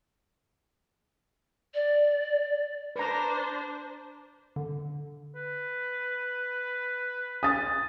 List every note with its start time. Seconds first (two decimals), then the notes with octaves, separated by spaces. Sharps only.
1.74 D5
2.96 D4 B4 C5 A#5
4.56 D3
5.36 B4
7.43 D#6 A6